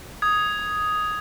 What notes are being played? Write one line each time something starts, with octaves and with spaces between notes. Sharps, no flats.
D#6 G#6